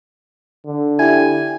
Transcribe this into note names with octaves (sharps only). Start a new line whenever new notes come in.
D3
E4 G4 G#5